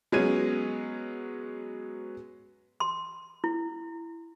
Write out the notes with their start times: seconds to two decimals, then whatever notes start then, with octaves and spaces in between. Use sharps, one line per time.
0.12 F#3 G#3 B3 C#4 G#6 D#7
2.80 C6
3.44 E4